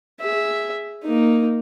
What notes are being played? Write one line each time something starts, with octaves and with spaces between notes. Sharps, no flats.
G#4 E5
A#3 D#4